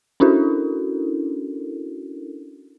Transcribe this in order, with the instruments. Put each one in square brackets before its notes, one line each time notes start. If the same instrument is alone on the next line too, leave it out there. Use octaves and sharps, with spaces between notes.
[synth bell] C#4 D4 E4 F#4 A4 A#4